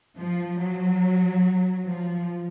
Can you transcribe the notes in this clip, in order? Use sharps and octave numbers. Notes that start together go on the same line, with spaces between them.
F3
F#3
F3